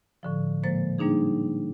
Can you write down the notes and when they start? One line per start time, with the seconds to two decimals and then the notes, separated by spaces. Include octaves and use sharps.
0.23 A2 D3 F3
0.63 A#2 F3 G#3 A#3 C5 A6
0.98 G3 A#3 D4 D#4 G#4